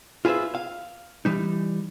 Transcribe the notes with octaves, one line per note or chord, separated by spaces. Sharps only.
F4 G#4 B4 C5 E5
F5
E3 G3 D#4